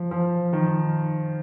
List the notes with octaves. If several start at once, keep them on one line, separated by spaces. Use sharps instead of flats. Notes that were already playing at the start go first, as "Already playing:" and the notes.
Already playing: F3
F3
D#3